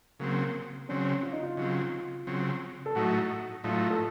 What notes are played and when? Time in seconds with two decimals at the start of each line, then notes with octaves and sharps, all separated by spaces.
0.20 C#3 F#3 A#3 C4
0.89 C#3 F#3 C4 C#4
1.23 F4
1.33 D#4
1.43 F4
1.57 C#3 F#3 C4
2.27 C#3 F#3 C4
2.86 A4
2.95 A2 F#3 A3 D#4 F#4
3.64 A2 F#3 A3 D#4 F4
3.90 A4